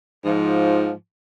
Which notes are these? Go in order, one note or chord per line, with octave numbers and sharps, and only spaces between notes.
G#2 F3